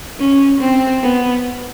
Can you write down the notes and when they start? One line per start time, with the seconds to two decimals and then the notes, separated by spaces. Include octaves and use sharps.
0.20 C#4
0.61 C4
1.03 B3